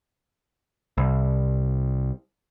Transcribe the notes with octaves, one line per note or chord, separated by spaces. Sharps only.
C2